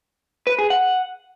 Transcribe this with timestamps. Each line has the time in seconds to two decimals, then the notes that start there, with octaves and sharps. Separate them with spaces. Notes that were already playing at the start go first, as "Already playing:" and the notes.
0.47 B4
0.59 G#4
0.70 F#5